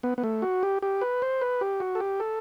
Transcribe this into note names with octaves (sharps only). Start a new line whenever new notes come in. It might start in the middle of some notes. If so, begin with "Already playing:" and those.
B3
B3
A3
F#4
G4
G4
B4
C5
B4
G4
F#4
A4
G4
A4